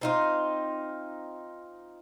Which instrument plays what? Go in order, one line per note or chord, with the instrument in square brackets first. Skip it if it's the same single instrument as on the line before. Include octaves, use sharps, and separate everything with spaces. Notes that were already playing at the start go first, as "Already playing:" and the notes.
[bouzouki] C4 D#4 F4